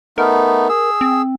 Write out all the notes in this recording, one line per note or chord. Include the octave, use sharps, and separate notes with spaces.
A3 B3 D#4 A#4
G#4 E6
C4